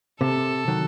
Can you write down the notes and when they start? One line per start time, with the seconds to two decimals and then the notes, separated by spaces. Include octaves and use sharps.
0.20 C3 A4
0.68 D#3 F#3